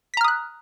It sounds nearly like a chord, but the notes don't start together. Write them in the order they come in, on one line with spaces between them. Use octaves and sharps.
B6 A#5 F6 D#6 F#6